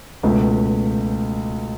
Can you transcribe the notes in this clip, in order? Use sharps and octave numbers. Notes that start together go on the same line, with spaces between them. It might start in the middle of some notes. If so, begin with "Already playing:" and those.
C#2 B2 A3